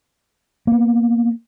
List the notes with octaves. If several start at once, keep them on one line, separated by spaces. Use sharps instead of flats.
A#3 B3